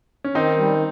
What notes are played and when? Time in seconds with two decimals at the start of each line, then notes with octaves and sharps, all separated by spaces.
0.24 C#4
0.34 D#3 C4 D#4
0.57 G3